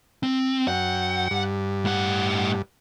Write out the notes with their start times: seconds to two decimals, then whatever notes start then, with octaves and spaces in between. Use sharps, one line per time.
0.23 C4
0.68 F#2 F#5 G5
1.31 G2
1.85 A2 F#5